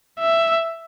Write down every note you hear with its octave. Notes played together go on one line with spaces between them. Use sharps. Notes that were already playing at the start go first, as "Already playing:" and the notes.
E5